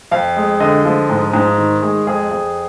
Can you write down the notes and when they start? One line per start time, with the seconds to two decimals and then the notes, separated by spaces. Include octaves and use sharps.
0.11 F2 F5
0.36 G#3
0.60 D3 D#5
0.85 F3
1.10 G#2
1.34 G#2
1.58 D#3
1.82 G#3
2.07 F2 G#4
2.31 F2